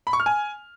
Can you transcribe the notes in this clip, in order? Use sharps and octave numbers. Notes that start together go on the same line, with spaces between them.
B5
C#6
F6
G#5